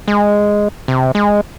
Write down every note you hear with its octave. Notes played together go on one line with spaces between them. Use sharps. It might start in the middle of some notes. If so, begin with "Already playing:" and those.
G#3
C3
G#3